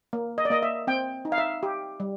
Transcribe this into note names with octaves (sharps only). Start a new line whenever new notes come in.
A#3
D#5
D5
A#3 D#5
E5
C4 G5
D#4
F5
E5
G4
G3